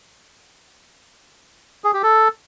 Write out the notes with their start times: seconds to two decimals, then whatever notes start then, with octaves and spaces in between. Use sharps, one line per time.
1.84 G#4
1.94 G4
2.03 A4